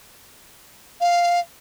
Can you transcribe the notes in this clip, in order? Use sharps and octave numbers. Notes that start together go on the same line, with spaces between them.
F5